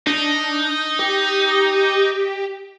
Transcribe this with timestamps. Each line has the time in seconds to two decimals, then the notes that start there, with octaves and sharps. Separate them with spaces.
0.07 D4 D#4
0.99 G4